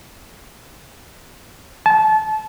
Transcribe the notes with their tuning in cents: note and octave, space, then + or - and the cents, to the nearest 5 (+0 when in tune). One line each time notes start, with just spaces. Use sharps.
A5 -25